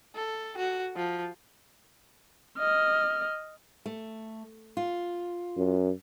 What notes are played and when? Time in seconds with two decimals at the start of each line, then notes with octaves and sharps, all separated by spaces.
0.15 A4
0.58 F#4
0.96 F3
2.58 D#5 F6
3.86 A3
4.77 F4
5.57 F#2